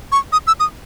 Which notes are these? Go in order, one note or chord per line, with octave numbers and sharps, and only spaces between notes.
C#6
D#6
E6
D#6